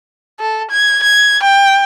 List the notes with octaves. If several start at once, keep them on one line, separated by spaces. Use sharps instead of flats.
A4
G#6
G#6
G5